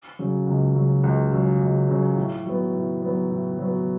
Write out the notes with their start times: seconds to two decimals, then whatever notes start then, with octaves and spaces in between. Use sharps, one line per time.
0.19 C#3 F#3
0.47 C#2
0.75 C#3 F#3
1.04 C#2
1.32 C#3 F#3
1.60 C#2
1.89 C#3 F#3
2.17 A2
2.46 F#3 B3
2.74 A2
3.02 F#3 B3
3.30 A2
3.59 F#3 B3